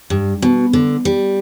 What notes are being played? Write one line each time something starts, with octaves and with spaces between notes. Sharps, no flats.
G2
B2
D3
G3